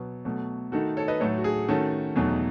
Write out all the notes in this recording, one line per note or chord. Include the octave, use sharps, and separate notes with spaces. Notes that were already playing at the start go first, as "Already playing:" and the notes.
Already playing: B2 F#3 B3
B2 F#3 A3
D#3 A3 D#4 F#4 A4
A4 C#5
B4 D#5
A2 F#3 A3 D#4 A4 C#5
F#4
G#4
D#3 A3 C#4 F#4 A4
E2 B2 F#3 A3 D#4